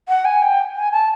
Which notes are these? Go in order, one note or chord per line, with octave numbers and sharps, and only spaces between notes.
F#5
G#5
G5
G#5
A5